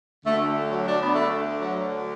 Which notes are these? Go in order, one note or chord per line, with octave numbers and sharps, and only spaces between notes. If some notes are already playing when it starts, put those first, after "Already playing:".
D2 D3 A3
F#3
D4
B3
A3
F#3